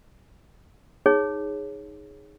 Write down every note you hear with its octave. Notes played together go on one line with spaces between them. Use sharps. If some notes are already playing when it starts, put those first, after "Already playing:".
D#4 G#4 C#5